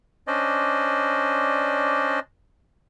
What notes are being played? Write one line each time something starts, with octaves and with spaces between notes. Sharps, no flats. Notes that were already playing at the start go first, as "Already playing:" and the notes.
C#4 D4 C5 D5 D#5